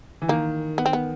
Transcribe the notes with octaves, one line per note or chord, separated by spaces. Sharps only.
E3
D#3 A#3
B3
C4
B3